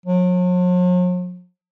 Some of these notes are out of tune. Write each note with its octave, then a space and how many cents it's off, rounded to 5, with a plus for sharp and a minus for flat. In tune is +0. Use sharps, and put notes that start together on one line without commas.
F#3 -45